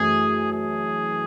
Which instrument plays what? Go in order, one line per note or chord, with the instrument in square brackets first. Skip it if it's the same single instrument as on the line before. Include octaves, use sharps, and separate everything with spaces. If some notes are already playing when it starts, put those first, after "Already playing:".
Already playing: [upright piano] F#2 E3 A3 C#4 [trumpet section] G#4
[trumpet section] G#4